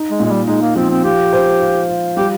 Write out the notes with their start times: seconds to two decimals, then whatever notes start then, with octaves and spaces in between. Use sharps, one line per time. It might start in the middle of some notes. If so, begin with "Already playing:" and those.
Already playing: D#4
0.11 G#3
0.20 A#2
0.25 G#3
0.29 G3
0.47 G#3 D#4
0.62 A#3
0.76 F3 C4
0.90 C4
1.04 F4 G4
1.33 C5
1.61 F4
1.89 F4
2.17 G3 G4